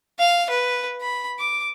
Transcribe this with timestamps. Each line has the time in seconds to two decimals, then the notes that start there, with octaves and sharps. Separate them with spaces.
0.19 F5
0.50 B4
1.01 B5
1.39 D6